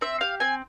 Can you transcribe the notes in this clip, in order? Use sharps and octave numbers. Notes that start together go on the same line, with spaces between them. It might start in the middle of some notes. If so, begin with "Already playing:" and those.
C4 E5
G4 F5
C4 G#5